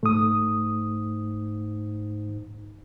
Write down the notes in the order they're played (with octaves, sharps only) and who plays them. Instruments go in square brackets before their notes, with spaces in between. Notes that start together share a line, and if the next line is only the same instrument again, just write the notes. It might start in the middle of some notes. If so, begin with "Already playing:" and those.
[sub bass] G#2 [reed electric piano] A3 D#6